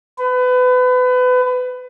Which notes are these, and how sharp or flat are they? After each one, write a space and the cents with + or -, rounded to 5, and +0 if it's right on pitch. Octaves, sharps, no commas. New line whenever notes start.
B4 +30